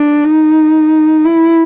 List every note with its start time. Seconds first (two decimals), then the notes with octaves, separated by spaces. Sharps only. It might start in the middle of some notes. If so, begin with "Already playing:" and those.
Already playing: D4
0.25 D#4
1.25 E4